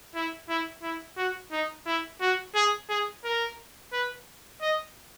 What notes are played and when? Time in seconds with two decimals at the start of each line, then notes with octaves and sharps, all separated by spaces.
0.15 E4
0.49 E4
0.83 E4
1.18 F#4
1.52 D#4
1.86 E4
2.21 F#4
2.55 G#4
2.89 G#4
3.24 A#4
3.92 B4
4.61 D#5